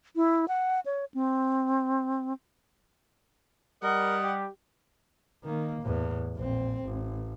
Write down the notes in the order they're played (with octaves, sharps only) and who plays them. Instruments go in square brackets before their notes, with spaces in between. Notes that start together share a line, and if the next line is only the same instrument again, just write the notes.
[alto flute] E4
F#5
C#5
C4
[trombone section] G3 [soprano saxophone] A#4 [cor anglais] D#5 [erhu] F#5
[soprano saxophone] G4
[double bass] D#3 A#3
E2 A2
A#1 C4
A1